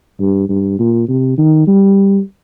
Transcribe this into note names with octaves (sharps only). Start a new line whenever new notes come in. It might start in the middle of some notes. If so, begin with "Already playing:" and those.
G2
G2
A#2
C3
D#3
G3